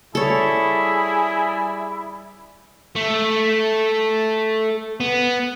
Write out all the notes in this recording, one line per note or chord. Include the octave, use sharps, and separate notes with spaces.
G3 E4 G#4 A4 C#5
A3
B3